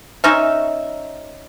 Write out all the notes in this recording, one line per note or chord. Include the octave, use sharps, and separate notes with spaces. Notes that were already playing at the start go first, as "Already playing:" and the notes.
C#4 D#4 E5